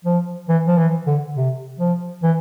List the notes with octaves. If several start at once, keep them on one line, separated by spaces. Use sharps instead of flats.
F3
E3
F3
E3
D3
C3
F3
E3